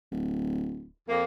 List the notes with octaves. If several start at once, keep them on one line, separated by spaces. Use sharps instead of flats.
D1
F2 A#3